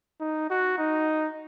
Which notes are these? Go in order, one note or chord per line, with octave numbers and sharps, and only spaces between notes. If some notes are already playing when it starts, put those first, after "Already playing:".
D#4
F#4
D#4